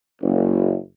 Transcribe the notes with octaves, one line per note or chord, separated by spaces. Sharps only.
F#1